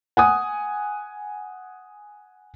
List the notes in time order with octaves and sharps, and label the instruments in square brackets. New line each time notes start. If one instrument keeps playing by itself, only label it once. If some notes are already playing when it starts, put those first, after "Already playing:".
[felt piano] F#5 G#5 D#6